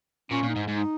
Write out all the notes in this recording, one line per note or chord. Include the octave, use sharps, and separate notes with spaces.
A#2 C#4
A#2
D#4
G#2
G#2
D#4